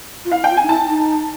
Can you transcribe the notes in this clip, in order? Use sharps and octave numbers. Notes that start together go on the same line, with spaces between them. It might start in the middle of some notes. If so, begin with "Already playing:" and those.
F4
E4 F5
G5
F4
G#5
D#4
E4 A5
D#4